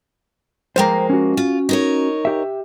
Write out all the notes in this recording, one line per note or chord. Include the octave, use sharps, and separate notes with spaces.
F3 G#3 A#3 C5 G5 A#5
C#4 F#4
F4
D#4 A#4 C#5
G4 E5